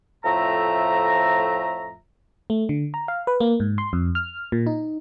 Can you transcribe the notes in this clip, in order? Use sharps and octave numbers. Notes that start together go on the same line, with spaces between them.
F2 A2 F3 A3 E5 A#5
A3
D3
A#5
F5
B4
A#3
G#2
C6
F2
F6
A#2
D#4